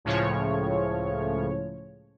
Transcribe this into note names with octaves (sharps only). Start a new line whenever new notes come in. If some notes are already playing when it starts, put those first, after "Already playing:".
C#2 A2 C#3 F3 C#5